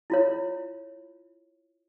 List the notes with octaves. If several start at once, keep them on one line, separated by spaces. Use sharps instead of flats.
E4 F4 C#5